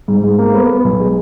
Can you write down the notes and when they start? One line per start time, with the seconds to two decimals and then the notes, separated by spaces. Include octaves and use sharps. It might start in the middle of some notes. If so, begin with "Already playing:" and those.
0.08 G#2
0.24 G#2
0.38 A#3
0.54 B3
0.69 B3
0.84 B1
1.00 G#3